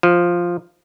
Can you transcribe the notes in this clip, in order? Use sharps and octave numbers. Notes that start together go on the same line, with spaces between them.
F3